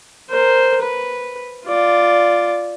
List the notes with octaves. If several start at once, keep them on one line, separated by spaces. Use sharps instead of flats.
A#4 C5
B4
F4 D5